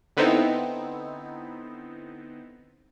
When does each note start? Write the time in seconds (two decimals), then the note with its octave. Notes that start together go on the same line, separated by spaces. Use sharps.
0.17 D3 B3 C4 D#4 E4